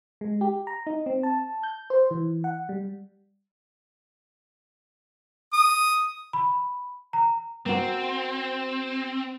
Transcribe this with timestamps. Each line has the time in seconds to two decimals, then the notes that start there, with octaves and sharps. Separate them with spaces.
0.21 G#3
0.41 G4
0.67 A#5
0.87 D#4
1.06 C4
1.23 A5
1.63 G6
1.90 C5
2.11 E3
2.44 F#5
2.69 G3
5.53 D#6
6.33 B5
7.13 A#5
7.66 A#3 C4 F#4